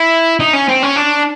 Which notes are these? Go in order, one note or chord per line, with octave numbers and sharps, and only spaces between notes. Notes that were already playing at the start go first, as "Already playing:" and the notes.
Already playing: E4
D#4
C#4
C4
C#4
D4